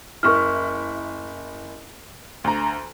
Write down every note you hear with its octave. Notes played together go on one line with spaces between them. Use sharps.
F#1 E4 A#4 C#6 F6
D2 A#5